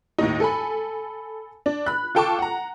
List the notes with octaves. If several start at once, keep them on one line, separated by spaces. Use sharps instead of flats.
D#2 A2 D#4
A4 G#5 B5
D4
B5 F#6
F4 A4 G5 A5 C#6 D6
F#5 A#5